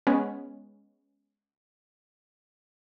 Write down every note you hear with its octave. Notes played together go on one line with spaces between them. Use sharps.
G#3 B3 C#4